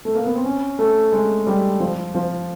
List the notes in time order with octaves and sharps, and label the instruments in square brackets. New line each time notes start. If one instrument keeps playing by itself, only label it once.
[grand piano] A3
A#3
B3
C4
C#4
A3
G#3
G3
F3
F3